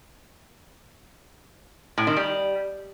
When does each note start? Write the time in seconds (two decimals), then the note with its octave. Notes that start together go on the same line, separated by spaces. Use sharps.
1.98 A2
2.07 D#3
2.17 G3